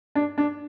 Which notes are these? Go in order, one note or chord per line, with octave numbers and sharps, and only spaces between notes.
D4
D4